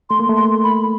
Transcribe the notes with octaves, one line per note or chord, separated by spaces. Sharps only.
A3 C6
A#3
A3
C6
B5